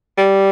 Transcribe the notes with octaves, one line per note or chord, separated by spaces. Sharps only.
G3